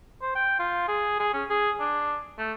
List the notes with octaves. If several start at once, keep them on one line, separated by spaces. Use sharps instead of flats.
C5
G5
F4
G#4
G#4
C#4
G#4
D4
A3